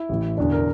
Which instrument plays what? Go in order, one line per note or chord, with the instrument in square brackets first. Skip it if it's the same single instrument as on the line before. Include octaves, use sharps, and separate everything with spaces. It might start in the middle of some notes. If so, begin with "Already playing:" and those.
Already playing: [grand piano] E4
A1 A2 E3
E1 E2 D3 D4
A#4